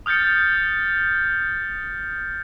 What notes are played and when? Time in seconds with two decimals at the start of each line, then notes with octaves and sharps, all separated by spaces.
0.06 D#6 F6 G6 A6 C#7